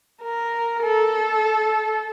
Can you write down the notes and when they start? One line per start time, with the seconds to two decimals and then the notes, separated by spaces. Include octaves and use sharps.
0.22 A#4
0.83 A4